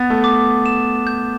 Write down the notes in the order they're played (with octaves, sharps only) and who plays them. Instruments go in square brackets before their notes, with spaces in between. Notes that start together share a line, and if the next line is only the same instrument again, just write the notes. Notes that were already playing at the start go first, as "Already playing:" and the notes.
Already playing: [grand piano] B3 [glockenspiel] A6
[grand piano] A3
[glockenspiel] D6
E7
G6